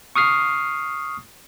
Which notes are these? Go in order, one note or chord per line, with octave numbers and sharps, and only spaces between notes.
C#6 D#6 F6 C7